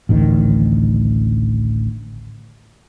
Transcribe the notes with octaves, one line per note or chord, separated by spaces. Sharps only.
A1 D2 D#3